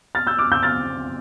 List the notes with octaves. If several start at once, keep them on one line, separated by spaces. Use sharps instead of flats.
F6 A6
E6 G6
D6 F6
E6 G6
F6 A6